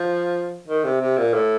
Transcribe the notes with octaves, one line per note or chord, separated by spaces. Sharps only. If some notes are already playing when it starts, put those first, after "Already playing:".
Already playing: F3
D#3
C3
C3
A#2
A2